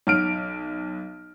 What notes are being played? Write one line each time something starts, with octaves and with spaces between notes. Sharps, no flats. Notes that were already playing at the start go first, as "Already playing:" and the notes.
B1 F6 D7